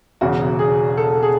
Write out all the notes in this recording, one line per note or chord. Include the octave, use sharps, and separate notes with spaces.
E1 E2 C#3 F#4
G#4
A4
G#4